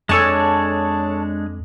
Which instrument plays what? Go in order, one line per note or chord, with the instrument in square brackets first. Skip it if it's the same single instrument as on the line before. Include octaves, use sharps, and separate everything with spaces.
[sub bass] F2 [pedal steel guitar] G#3 D4 G#5 [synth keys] A4 C#5 A5